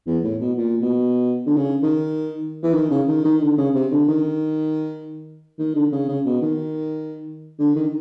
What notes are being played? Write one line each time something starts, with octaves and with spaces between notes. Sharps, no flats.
E2
A2
B2
A#2
B2
D3
C#3
D#3
E3
D#3
C#3
D#3
D#3
D3
C#3
C3
D3
D#3
D#3
D3
C#3
C#3
B2
D#3
D3
D#3